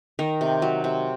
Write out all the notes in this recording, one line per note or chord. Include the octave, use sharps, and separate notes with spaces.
D#3 A#4
C3
F#3
C3